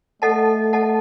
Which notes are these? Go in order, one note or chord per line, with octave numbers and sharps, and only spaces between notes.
A3 A4 D#5 F#5 A5
A4 D#5 F#5 A5